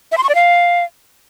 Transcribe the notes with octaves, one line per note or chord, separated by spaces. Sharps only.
E5
C6
C#6
D5
F5